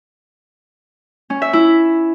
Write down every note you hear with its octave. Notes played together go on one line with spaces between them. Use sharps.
C#4
E5
E4